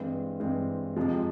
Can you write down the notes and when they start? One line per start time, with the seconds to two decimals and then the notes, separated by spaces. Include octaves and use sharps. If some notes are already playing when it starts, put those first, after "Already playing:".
Already playing: G2 E3 G#3 C4
0.40 G2 E3 G#3 C4
0.96 F2 C3 F3 G#3